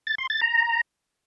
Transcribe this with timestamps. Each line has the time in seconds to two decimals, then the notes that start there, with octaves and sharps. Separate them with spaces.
0.07 A6
0.18 C6
0.30 A6
0.41 A#5